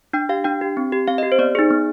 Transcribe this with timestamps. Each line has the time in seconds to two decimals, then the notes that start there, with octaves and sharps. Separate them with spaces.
0.13 D4 G5
0.29 G4 F5
0.44 D4 G5
0.61 G4
0.77 C4
0.92 G4
1.07 C4 F5
1.18 D#5
1.23 G4
1.32 C5
1.39 B3 D5
1.55 D#4 G#4
1.70 B3